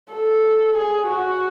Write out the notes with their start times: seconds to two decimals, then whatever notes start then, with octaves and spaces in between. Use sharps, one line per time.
0.12 A4
0.77 G#4
1.09 F#4